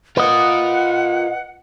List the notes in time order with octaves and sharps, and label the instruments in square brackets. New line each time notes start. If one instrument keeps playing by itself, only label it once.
[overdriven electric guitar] F4 A#4 [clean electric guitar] B4 D#5 [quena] F#5